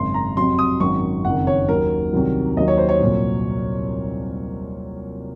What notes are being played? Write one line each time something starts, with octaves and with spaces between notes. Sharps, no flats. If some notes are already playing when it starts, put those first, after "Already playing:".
Already playing: G#1 F#2 C#3 C6
A#5
F2 C3 F#3 C6
D#6
G#1 F#2 D#3 F#3 C#6
F#1 F2 D#3 F#5
C#5
D#2 D#3 F#3 A#4
C2 C3 D#3 F#3
D#2 D#3 F#3 D#5
C#5
C5
C#5
C2 A#2 F#3